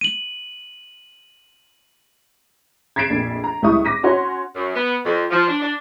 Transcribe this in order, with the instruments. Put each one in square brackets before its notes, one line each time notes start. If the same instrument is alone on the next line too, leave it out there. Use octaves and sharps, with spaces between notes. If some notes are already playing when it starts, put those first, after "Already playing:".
[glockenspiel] D#7 F#7
[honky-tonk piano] G#6 A6 B6 C7 D7 E7
A#1 F2 A#2
A#5
C#2 G3 E4 E5 C#6 D#6
D6 A#6 B6 D#7
C#4 F#4 C#5 F#5 C6
[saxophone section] F#2
B3
F2
F3
D4
D4